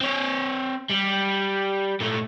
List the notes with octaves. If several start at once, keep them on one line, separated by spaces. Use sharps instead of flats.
C4 C#5
G3
A#2 A3